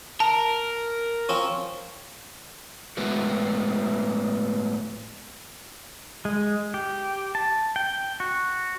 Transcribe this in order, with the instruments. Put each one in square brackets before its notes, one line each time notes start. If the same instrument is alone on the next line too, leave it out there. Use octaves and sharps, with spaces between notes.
[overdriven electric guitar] A#4 [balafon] A5
[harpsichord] F3 C4 C#4
[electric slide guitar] A2 G#3 B3 F#4
[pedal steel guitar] G#3
G4
A5
G5
F#4